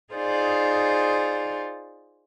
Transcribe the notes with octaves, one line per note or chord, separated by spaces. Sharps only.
D#4 F4 G#4 C5 D5